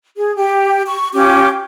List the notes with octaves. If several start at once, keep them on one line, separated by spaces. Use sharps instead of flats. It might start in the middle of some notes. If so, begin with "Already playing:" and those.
G#4
G4
C#6
C#4 F4 G4 D6